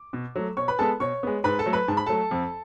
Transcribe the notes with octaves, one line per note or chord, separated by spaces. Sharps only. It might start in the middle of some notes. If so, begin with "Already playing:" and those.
Already playing: D6
B2
F#3 A3
B2 C#5 C#6
B4 B5
G#3 B3 A4 A5
B2 C#5 C#6
G#3 B3
G#2 B4 B5
A4 A5
F#3 A3
B4 B5
G#2 A5
B5
F#3 A3 A4 A5
F2